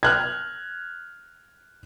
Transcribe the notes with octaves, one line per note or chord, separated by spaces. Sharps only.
F6 F#6 G#6